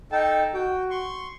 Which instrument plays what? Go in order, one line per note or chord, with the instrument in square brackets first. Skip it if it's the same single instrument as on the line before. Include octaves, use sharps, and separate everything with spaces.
[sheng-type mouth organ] D#4 A4 A5 [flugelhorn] G5
[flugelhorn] F#4 [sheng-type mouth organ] G5
[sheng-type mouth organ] C6 C#6